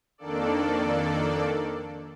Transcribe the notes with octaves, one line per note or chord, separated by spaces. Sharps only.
F2 D#3 A#3 D4 A4 D5